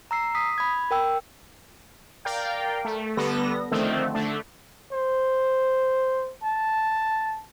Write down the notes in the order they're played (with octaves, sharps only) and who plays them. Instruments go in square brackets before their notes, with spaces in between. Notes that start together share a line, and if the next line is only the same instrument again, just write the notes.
[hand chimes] A#5 E6 C7
D#6 B6
B5 G#6
A#4 G5 E6
[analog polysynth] A#4 D5 F5 G5
A3
D3 G3 B3 A4 A#6
D3 D#3 F3 A3 C4
D3 A3 D4
[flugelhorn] C5
A5